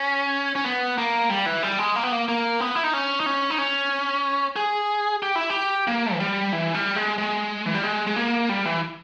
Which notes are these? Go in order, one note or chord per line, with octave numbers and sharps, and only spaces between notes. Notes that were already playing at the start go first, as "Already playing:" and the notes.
Already playing: C#4
C#4
B3
A#3
G3
E3
G3
G#3
A#3
B3
A#3
A#3
B3
E4
D#4
C#4
D#4
C#4
D#4
C#4
G#4
G4
E4
G4
A#3
E3
G3
E3
G3
G#3
G#3
E3
G3
G#3
G#3
A#3
G3
E3